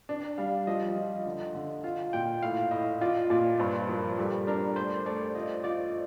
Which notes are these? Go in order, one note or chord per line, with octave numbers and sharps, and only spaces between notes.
D4
G3 F5
F3 D#5
F3
D3
D3
F4 F5
A#2 G5
A2 F5
A2 D#5
F4 D5
A#2 D5
G2 C5
F3 A#4
G3 A4
D4 A#4
A3 C5
A3 D5
F4 D#5
F4 D5